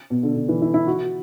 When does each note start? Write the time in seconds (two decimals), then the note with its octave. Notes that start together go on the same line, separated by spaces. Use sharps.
0.10 B2
0.23 D3
0.36 D3
0.49 E3
0.62 E4
0.74 E4
0.87 F#4